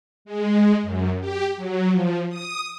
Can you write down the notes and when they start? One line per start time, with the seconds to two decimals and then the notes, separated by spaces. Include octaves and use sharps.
0.25 G#3
0.82 F#2
1.20 G4
1.56 F#3
1.89 F3
2.29 D#6